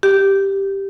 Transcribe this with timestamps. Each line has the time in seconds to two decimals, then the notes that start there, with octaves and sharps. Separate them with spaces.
0.03 G4